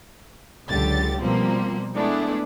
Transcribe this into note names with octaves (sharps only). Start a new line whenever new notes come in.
C#2 D3 F#3 G4 A6
B2 F3 G3 A#3 C4
G#3 A3 B3 D4 E4 G#4